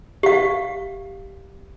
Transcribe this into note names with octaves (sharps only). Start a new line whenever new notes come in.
G4 F5